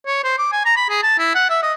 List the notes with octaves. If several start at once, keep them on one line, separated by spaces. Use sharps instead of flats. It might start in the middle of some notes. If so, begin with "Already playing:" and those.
C#5
C5
D6
G#5
A#5
B5
G#4
A5
E4
F#5
E5
D#5